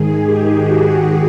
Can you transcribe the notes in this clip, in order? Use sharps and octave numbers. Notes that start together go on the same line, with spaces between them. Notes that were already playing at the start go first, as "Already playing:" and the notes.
Already playing: G#2 D#3 G#4
G4
F#4